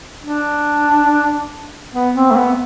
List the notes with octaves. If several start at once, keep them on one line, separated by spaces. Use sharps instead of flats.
D4
B3
C4
A3
B3